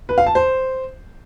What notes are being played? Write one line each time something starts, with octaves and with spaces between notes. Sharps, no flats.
B4
F5
A5
C5